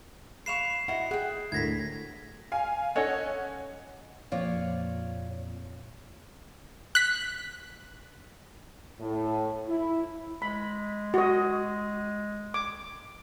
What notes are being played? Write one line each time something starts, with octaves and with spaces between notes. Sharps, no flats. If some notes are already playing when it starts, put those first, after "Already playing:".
B4 F5 C#6 C7 E7 F7
E4 F#4 D#5 F#5
G#4 F#5 G5
D2 A2 E4 A#4 G#6 A#6 B6
F5 G#5
C#4 A4 C#5 D#5 F#5
F2 A#2 C4 F4 C#5 D5
F#6 B6
A2
E4
G#3 B5
F#4 D#5
D6